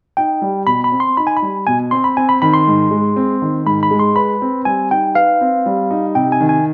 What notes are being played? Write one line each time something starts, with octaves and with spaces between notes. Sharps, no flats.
D#4 G5
G3
B2 B5
B5
C4
C6
D#4 B5
G#5
B5
G3
B2 G#5
C4 C6
B5
C4 G#5
B5
D#3 B5
C6
G#2
G#3
C4
D#3
G#2 B5
B5
G#3
C6
B4 B5
C4
G3 G#5
D#4 G5
B4 F5
C4
G3
D#4
C3 G5
G#5
D#3
G#5